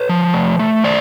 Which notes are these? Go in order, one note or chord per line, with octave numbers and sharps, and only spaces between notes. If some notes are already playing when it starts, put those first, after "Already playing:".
Already playing: B4 C#5
F3
A3
A3
D#3 C5 D5